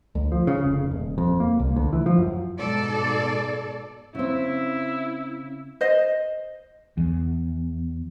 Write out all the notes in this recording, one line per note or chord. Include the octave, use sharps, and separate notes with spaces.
D2
F3
C#3
F1
D#1
F2
A#3
C2
D2
E3
F3
F#2
G#2 B2 A4 D5
C#3 C4 E4
C5 D#5
E2